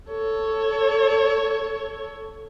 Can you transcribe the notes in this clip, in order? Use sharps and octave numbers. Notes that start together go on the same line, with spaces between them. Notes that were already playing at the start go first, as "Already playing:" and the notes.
A4 C#5